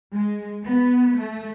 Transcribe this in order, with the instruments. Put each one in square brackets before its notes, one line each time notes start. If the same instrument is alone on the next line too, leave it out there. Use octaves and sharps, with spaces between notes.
[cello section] G#3
B3
A3